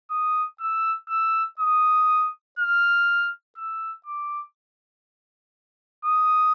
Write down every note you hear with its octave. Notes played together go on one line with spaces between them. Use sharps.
D#6
E6
E6
D#6
F6
E6
D6
D#6